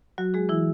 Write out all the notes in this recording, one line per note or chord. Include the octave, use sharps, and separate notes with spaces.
F#3 F#4
G#3 G#4
E3 E4